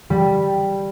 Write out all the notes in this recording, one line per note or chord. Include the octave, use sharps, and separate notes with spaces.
G3